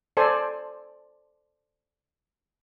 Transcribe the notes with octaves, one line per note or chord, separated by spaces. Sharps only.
A4 C5 D5 G#5